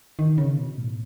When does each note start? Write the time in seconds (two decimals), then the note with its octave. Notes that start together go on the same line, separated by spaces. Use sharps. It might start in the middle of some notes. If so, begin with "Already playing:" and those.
0.19 D#3
0.38 C#3
0.57 B2
0.77 A2